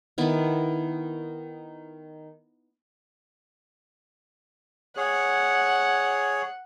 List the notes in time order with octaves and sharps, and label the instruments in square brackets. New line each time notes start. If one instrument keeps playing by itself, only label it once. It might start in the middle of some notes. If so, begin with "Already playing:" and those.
[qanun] D#3 B3 E4
[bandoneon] G#4 C#5 [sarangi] F#5